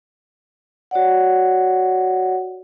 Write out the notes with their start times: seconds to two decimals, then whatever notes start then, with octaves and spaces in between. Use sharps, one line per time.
0.91 F#4 C#5 D5 F#5